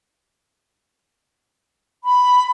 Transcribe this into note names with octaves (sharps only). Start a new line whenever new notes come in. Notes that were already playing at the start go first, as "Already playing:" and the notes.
B5